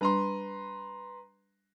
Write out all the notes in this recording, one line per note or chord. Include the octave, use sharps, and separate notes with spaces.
G3 D4 B4 A#5 C6